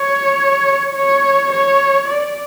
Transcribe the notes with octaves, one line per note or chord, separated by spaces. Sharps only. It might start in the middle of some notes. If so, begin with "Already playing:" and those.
Already playing: C#5
C#5
C#5
D5